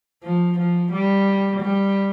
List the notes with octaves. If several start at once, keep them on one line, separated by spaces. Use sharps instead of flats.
F3
F3
G3
G3